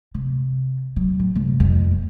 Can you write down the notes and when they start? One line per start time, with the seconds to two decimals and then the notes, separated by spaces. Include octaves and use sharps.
0.14 C3
0.96 F#3
1.19 A2
1.35 F#2 C3
1.60 F2
1.91 A#2